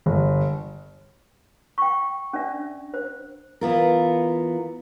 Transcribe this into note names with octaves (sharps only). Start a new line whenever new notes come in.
G1
G5 C#6
C#4 D4 D5 E5
C5
E3 B3 F4 A#4